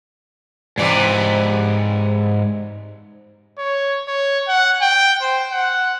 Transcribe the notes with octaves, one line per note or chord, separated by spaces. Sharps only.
G#2 C3 E3 G3 D5
C#5
C#5
F#5
G5
C5
F#5